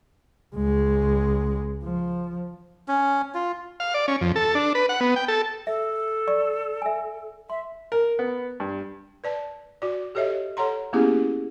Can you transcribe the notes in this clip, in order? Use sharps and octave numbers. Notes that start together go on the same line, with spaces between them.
C#2 G#3
F3
C#4
F4
F5
D5
C#4
F2
A4
D4
B4
F#5
B3
G5
A4
A4 E5
D5 C#6
E5 G#5
E5 C6
A#4
B3
G2
B4 D5 A5
F#4 D5
G4 A4 C#5 D#5 E5
A4 C#5 F#5 A#5 C6
A#3 B3 C#4 E4 G4 G#4